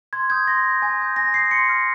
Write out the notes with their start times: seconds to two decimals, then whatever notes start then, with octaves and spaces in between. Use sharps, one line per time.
0.13 C6 G#6
0.30 D#6 G6 G#6
0.47 C6 A#6
0.64 D#6
0.69 G6
0.82 G#5
1.00 D#6 G6
1.16 G#5 A#6
1.34 D#6 G6 C7
1.51 C6 C#7
1.69 F6